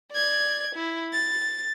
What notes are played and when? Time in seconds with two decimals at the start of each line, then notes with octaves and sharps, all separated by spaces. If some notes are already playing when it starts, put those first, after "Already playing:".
0.12 D5 G#6
0.75 E4
1.13 A6